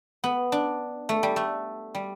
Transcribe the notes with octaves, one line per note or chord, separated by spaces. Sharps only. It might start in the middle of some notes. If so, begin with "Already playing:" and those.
B3
D4
A3
G3
A3
G3